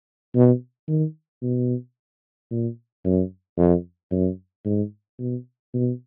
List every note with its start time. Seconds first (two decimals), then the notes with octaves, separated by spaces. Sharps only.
0.35 B2
0.88 D#3
1.42 B2
2.51 A#2
3.04 F#2
3.57 F2
4.11 F#2
4.65 G#2
5.19 B2
5.74 B2